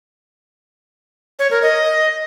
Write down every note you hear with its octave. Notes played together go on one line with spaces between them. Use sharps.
C#5
A#4
D#5